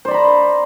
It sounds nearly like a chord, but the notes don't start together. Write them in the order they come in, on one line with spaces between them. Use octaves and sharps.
C5 D5 B5 A#5